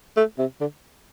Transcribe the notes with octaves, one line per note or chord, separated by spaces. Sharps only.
A3
C3
D3